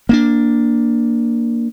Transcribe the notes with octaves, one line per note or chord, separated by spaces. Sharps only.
A#3 B3 D4